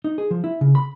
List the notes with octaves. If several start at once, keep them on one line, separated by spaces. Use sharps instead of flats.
D#4
G#4
F3
E4
C#3
B5